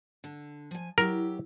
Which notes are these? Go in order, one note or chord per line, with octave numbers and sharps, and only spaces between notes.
D3
F3 G#5
F#3 E4 G4 A#4